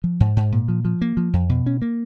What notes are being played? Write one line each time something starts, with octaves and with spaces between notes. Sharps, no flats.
F3
G#2
G#2
A#2
F3
F3
A#3
F3
F2
B2
C#4
A#3